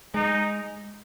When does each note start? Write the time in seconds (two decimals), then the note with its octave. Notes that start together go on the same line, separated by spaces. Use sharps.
0.14 G#3 D#4